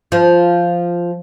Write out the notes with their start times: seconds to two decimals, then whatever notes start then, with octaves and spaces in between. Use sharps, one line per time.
0.12 F3